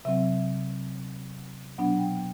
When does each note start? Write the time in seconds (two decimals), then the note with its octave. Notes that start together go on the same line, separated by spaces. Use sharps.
0.05 C3 F#3 C4 E5
1.78 B2 F#3 B3 D4 F#5
1.99 G5